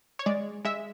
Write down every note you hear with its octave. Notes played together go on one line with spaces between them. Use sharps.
C#5
G#3 D5
G#3 E5